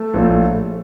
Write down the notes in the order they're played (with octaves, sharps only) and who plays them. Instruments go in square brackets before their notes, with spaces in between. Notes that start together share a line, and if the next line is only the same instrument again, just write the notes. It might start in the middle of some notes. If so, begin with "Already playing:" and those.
Already playing: [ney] A3
[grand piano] A#1 A2 F3